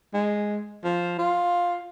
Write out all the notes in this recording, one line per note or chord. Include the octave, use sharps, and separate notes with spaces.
G#3
F3
F4